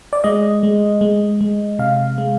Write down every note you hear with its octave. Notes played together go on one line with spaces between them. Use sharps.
D5
G#3 D#5
G#3
G#3
G#3
C3 F5
G#3